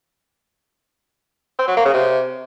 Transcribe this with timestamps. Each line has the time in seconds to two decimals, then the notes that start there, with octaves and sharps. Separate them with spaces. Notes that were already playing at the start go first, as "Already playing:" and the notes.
1.59 C4
1.68 F#3
1.76 A#3
1.85 C#3
1.94 C3